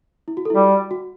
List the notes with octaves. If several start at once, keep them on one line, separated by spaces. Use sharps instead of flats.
E4
F#4
A4
E4
G3 F#4
F#4